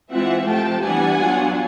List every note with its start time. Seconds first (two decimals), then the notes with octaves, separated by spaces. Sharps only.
0.11 E3 G#3 C4 F4 E5 F#5
0.46 C3 F3 A3 G5 A5
0.82 E3 G3 B3 D4 F#5 G#5
1.18 F#3 B3 D4 F4